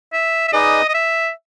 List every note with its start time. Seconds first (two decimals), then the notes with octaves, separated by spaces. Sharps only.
0.13 E5
0.48 E5
0.53 D#4 G#4 B4 D5 D#5
0.88 D#5
0.94 E5